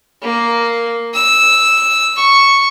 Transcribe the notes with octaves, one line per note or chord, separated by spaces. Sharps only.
A#3
E6
C#6